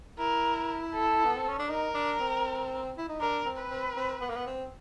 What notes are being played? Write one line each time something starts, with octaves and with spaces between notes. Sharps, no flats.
E4 A#4
A4
B3
C4
C#4
D4
D#4 A#4
D4
C4
E4
D#4
D4 A#4
C4
B4
C4
C4
B3
A#3
B3
C4